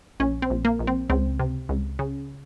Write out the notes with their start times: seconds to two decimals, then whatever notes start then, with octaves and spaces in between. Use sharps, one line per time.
0.20 A#1 C#4
0.42 C4
0.50 A#1
0.65 A#3
0.79 A#1
0.87 C4
1.10 C#2 C4
1.39 C3
1.69 C#2
1.99 C#3